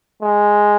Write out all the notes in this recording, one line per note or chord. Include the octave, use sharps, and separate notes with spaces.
G#3